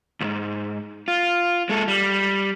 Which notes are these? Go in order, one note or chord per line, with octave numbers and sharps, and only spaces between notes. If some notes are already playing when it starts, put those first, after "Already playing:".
C#2 G#2
F4
G#3 A4
G3